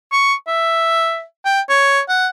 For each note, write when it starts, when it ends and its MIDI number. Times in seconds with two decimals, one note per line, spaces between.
0.12 0.34 85
0.48 1.23 76
1.45 1.61 79
1.70 2.01 73
2.09 2.28 78